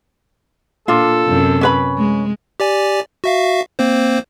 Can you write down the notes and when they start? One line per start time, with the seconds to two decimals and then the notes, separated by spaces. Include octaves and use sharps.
0.88 A#2 D4 F4 A4
1.26 F#2 C3
1.61 C#4 B4 B5
1.98 G#3
2.60 G4 D5 G#5
3.24 F#4 E5 F5
3.79 A#3 C4 C5